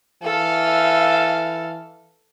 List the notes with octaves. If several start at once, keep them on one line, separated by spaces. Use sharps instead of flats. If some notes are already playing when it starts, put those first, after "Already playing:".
E3 A4 F5